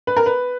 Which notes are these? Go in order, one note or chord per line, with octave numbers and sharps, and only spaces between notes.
B4
A#4
B4